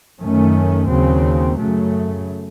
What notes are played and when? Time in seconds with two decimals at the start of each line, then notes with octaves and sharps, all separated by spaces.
0.21 F#2 D#3 A3 C#4
0.89 D#2 C#3 F#3 C4
1.58 F#2 C#3 F#3 A3